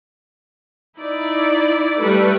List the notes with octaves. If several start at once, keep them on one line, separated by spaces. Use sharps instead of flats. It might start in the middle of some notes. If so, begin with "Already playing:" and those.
D#4 E4 D5
G3 A3 A4 B4